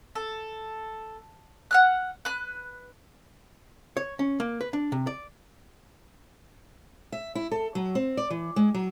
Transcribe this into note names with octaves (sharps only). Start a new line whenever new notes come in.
A4
F#5 F6 F#6
B4 F#6
C#5
C#4
A#3
B4
D4
C3
D5
E5
E4
A4
F#3
C4
D5
E3
G#3
F#3